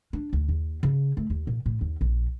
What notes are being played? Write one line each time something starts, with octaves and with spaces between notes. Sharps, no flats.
D4
D2
D#2
C#3
A3
D#2
A#2
A2
D#2
A#1